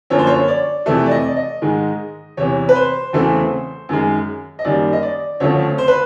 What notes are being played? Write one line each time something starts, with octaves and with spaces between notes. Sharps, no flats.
F#2 D3 F3 A#3 C#5
C5
C#5
D5
F2 C3 E3 A3 E5
D5
D#5
D5
D#5
G#2 D#3 G#3
E2 C3 E3 C#5
B4
C5
E2 C#3 E3 A3 C4
F#2 D#3 G#3
D#5
F#2 D#3 G3 A#3 D5
D#5
D5
D2 C#3 F3 A3 C4 C#5
C5
B4